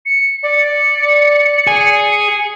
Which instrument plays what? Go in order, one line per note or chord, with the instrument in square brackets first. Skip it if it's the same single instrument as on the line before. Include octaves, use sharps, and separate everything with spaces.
[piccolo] C#7
[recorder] D5 [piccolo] C#7
[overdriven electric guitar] G#4